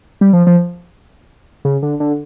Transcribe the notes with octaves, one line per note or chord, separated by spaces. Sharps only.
G3
F3
F3
C#3
D3
D3